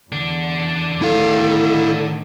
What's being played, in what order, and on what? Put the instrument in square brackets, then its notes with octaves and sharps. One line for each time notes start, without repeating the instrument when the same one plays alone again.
[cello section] E2 [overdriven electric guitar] D3 D4
[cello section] A2 D#3 [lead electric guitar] E4 F5 [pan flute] A4